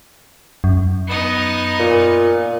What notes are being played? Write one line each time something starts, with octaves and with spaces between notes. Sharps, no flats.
F#2
B3 D#4
A#2